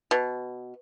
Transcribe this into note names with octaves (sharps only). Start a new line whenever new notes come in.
B2